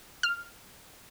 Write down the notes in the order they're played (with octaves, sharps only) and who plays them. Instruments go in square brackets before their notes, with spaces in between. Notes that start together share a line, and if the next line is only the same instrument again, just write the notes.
[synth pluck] F6